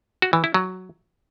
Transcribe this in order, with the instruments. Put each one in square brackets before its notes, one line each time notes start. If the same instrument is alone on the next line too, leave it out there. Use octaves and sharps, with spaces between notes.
[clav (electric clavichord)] F#4
E3
E4
F#3